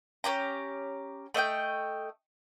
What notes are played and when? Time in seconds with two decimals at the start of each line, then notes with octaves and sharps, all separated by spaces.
0.24 C#4 D4 G4 A#5
1.34 A3 D#5 F#5 G5